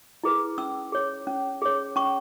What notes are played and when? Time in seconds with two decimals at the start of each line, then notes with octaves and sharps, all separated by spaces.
0.24 E4 G#4 B4
0.58 C#4 E6
0.92 G#4 C#5
1.27 C#4
1.62 G#4 C#5
1.96 C#4 C#6